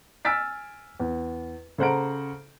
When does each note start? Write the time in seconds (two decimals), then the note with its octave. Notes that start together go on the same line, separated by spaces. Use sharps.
0.25 G#5 E6 F6 A6 B6 D7
1.00 E2
1.78 C#3 A4 C5 F#5 A#5 D7